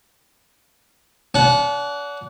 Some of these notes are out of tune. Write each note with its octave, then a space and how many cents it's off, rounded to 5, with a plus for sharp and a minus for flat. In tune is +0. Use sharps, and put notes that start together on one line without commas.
D4 -40 F#5 +0